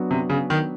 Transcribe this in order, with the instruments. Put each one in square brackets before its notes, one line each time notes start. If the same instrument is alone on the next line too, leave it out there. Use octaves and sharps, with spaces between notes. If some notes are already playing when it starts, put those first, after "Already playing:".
Already playing: [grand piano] F#3 B3 D4 F#4
[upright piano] C3
C#3
D#3